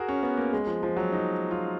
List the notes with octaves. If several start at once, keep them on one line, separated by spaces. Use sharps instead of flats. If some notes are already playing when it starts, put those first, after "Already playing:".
Already playing: F#4 G#4 A#4
C#4
B3
A#3
G#3
F3
F3
F#3
D#4
F4